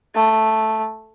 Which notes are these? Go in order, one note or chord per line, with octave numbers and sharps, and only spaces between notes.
A3